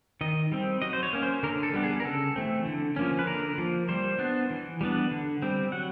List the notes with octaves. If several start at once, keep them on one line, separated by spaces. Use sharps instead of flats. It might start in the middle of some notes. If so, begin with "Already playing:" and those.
D#3 D#5
G3 C4
F#3 D#5
C5
C#5
A#3 C#4
C5
D3 A#4
A4
G3 B3 D4
G#4
A#4
C#3 A4
E3 A3 C4
D3
F3 A#3 C#4
B4
D3 A#4
F3 A#3
G3 C5
B3 D4
E3
G3 B3 D4
D3
G3 C4
F#3 F#5